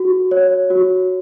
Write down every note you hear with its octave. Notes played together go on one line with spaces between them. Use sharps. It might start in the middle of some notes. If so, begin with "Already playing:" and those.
Already playing: F#4
C#5
F#4